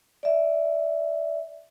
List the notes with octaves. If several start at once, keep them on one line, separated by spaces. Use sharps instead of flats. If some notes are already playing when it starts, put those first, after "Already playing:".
D5 E5